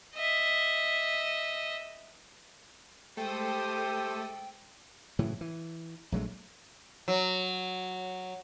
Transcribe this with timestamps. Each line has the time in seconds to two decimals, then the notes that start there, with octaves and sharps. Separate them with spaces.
0.15 D#5 E5
3.17 G#3 A3 G4 A4 C5 G5 D#6
5.19 A2 C#3 E3 F#3
5.41 E3
6.12 A#1 F#3 G#3 A3
7.08 F#3